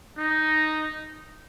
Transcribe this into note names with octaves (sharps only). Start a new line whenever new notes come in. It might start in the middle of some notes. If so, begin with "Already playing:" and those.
D#4